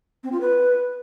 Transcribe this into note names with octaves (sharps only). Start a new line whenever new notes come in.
C4
F4
B4